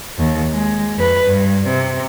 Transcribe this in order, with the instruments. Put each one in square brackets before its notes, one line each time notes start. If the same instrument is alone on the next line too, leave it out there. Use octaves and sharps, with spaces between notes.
[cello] D#2
G#3
F2 B4
G2
C3